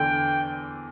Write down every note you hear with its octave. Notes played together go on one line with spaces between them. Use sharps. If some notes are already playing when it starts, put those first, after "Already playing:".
Already playing: E2 D3 G5